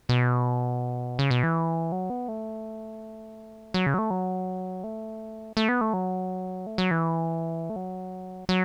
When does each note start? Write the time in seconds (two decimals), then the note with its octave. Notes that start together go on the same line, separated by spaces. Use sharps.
0.09 B2
1.19 C#3
1.31 B2
1.43 E3
1.92 F#3
2.10 B3
2.28 A3
3.74 F#3
3.86 C#3
3.94 F#3
3.98 A3
4.11 F#3
4.84 A3
5.57 A3
5.69 B3
5.81 A3
5.93 F#3
6.67 A3
6.78 F#3
6.91 E3
7.70 A3
7.76 F#3
8.49 F#3